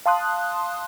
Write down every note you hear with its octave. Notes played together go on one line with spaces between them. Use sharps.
F5 A5 C6 D#6 F#6